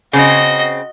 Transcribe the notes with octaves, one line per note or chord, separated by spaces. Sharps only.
C#3 C4 F#4 D#5